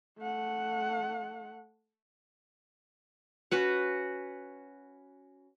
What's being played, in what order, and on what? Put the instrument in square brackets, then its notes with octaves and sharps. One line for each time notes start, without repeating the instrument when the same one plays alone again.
[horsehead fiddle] A3 F#5
[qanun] C#4 F#4 B4 F#5